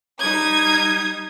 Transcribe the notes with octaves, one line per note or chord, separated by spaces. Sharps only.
G3 D#4 D#6 G#6